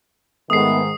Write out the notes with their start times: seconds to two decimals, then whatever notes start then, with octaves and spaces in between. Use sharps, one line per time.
0.50 G#2 D#3 A3 B3 D#6 C7